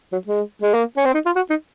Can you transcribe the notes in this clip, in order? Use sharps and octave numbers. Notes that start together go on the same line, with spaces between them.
F#3
G#3
G#3
A#3
C#4
C4
D#4
F4
F#4
D#4